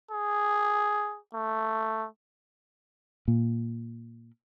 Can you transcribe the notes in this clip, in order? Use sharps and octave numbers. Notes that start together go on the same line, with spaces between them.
G#4
A3
A#2